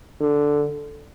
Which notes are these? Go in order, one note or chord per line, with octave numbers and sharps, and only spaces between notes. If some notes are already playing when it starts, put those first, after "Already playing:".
D3